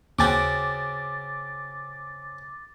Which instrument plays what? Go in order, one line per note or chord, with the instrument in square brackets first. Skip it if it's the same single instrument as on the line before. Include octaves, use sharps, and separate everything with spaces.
[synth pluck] D#2 G5 [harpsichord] C#3 C4 F#4 [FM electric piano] D6 A6